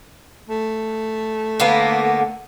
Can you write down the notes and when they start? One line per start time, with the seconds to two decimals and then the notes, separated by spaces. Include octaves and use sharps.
0.49 A3
1.60 D3 A#3 B3